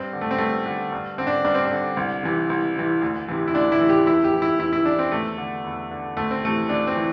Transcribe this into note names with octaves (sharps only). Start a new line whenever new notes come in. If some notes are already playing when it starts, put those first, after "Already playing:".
Already playing: G2 C4
D3
A3
C4
G2 A3
D3
G2
D3 C4
D4
G2 D4
C4
D4
D3
C2
C3 E3
C2
C3 E3
D2
C3 E3
E4
D2 D4
E4
C3 E3
G4
E2 E4
G4
E3
E4
E2 E4
E4
E3 D4
C4
E2 A3
D3
E2
D3
D2 A3
C4
C3 E3 A3
D2 D4
C4
E3